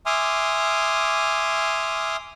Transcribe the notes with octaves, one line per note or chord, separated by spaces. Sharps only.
E5 G#5 C6 D6 D#6 F6